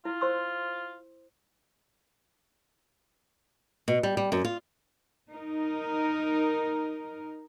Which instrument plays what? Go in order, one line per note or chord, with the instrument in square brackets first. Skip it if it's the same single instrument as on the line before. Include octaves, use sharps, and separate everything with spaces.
[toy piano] E4 [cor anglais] F4
[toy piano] C5 C6 E6
[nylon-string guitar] B2
G3
G3
F#2
F4
[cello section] D#4 A#4